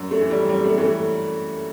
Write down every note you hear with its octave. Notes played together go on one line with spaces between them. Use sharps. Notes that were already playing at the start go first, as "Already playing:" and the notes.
Already playing: F#2
A3
E3
G3
F#2 G3
A3
E3 A3